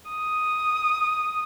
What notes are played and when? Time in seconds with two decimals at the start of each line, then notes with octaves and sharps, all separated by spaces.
0.11 D#6